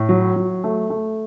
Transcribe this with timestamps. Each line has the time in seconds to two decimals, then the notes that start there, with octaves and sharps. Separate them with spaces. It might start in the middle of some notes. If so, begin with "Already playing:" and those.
Already playing: A2
0.09 F#3
0.36 F#3
0.64 A3
0.90 A3